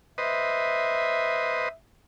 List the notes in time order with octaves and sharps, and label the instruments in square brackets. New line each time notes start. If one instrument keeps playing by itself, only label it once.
[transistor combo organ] B4 C5 D#5 [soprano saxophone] E5